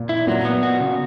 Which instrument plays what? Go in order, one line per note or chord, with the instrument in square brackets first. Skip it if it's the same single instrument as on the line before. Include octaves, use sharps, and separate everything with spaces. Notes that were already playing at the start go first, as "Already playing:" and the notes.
Already playing: [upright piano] A#2
[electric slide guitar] E4
[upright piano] A#2 [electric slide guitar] F#3
[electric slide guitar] B3
F#4
C#3